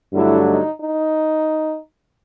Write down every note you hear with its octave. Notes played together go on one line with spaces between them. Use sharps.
G2 D3 F#3 A3 E4
D#4
D#4